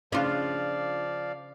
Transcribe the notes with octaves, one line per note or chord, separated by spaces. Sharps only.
C#3 F3 D4 F4 D5 F5